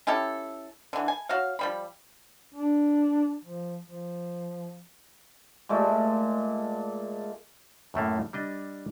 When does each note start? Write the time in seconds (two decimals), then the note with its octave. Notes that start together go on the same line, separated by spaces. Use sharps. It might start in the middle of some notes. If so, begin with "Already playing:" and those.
0.07 C#4 E4 G4 A4
0.93 D3 E3
1.08 G#5
1.29 F#4 C#5 F5
1.59 F3 G3 B5
2.54 D4
3.45 F3
3.86 F3
5.69 A#2 G#3 A3 A4
7.94 F#2 A2 A3 A#3
8.33 G3 D4 D#5